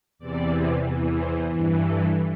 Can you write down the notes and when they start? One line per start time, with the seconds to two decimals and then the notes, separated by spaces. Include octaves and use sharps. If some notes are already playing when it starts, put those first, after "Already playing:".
0.19 E2 C3 E3 D5
0.85 E2 E3
1.17 C5
1.51 G2 E3
1.83 A4